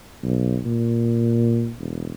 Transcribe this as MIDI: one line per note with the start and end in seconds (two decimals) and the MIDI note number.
0.23 0.59 35
0.65 1.72 46
1.79 2.14 28